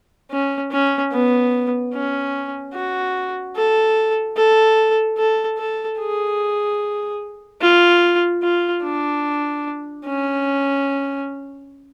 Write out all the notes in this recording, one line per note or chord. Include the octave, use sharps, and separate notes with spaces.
C#4
C#4
B3
C#4
F#4
A4
A4
A4
A4
G#4
F4
F4
D4
C#4